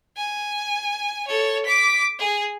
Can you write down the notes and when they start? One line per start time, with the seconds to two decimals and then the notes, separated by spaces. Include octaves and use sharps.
0.16 G#5
1.27 A4 C#5
1.65 D6 B6
2.19 G#4